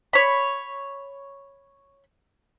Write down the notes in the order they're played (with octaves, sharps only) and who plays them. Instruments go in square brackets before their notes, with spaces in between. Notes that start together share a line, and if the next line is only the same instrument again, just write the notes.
[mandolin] C#5 B5